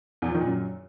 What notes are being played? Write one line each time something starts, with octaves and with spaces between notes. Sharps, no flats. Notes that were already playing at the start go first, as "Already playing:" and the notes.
E2
F3
D#3
A#2
F#2